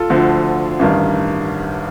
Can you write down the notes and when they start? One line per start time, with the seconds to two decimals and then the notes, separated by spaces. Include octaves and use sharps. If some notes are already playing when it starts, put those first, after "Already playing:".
Already playing: F4 A4
0.10 D2 D3 F3
0.79 A1 G2 D#3